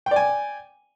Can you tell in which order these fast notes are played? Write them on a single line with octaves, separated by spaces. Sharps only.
G5 D5 G#5